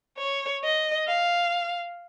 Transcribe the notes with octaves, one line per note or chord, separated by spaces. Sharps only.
C#5
D#5
F5